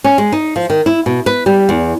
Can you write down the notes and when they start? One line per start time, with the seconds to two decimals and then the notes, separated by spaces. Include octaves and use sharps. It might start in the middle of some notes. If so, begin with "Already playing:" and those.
0.04 C#4
0.18 G#3
0.32 D#4
0.56 F3
0.70 D#3
0.86 E4
1.06 B2
1.26 B4
1.46 G3
1.69 E2